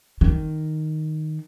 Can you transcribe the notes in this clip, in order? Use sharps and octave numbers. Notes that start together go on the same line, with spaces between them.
D#3